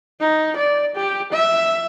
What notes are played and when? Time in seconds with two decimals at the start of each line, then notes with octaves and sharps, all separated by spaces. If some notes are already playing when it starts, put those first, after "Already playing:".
0.20 D#4
0.56 D5
0.95 G4
1.32 E5